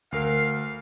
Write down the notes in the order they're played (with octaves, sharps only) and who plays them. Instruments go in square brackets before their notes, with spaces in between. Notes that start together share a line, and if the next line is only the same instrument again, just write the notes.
[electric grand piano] D2 A#4 F6 [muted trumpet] F5